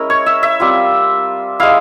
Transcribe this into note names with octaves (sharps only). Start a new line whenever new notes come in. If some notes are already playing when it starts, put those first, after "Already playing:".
Already playing: G#3 C#4 E4 A#4
C#5
E5
E5
G3 C4 F4
G#3 E4 F5